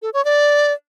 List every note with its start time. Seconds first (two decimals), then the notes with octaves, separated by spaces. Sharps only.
0.02 A4
0.13 C#5
0.25 D5